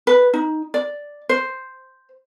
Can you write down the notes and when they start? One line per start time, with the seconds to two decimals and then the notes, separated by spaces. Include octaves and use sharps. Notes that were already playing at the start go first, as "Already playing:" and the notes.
0.07 B4
0.33 D#4
0.74 D5
1.29 C5